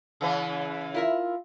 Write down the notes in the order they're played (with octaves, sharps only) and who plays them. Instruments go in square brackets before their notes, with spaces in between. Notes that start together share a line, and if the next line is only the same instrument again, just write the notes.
[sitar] C#3 E3 B4
[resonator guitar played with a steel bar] E4 A#4 E5 [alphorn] F4